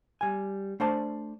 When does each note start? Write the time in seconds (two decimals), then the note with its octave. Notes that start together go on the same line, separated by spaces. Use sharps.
0.21 G3 G#5
0.80 A3 D4 C5 D5 A5